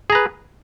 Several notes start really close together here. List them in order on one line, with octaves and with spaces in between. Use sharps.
G#4 A#5 B4